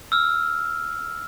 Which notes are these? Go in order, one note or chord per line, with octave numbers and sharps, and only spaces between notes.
E6 F6